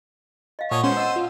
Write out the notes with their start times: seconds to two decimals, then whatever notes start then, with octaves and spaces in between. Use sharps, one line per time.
0.59 D#5 F5
0.71 A#2 C#5 D#5 F#5 A5 D#6
0.83 G#3 B3 C#4 C5 F#5
0.97 D#5 F#5 E6 D#7
1.16 F4